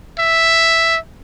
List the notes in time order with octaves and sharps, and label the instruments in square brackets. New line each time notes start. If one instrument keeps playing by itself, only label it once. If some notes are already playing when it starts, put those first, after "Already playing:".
[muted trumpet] E5